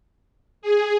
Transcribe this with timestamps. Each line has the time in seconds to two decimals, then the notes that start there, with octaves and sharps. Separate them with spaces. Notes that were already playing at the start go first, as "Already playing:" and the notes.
0.62 G#4